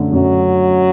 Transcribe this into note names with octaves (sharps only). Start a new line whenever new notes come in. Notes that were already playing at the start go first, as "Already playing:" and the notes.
Already playing: F#2 D3 A3
F#2 F#3